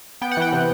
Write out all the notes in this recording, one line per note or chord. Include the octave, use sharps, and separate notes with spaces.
B3 G5
F#5
E3 G5
C3